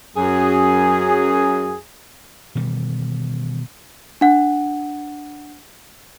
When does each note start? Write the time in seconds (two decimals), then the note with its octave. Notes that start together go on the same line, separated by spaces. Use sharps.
0.16 F#2 G#4
2.55 B2 D#3 E3 G3
4.21 D4 F#5